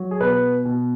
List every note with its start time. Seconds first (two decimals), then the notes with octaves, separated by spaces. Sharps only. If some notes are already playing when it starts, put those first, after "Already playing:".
Already playing: F#3
0.11 G#4
0.21 B2 B4
0.65 B2